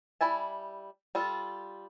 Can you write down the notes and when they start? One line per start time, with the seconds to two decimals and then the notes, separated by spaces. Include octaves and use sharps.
0.21 G3 E4 G#5 A5
1.15 G3 F4 A4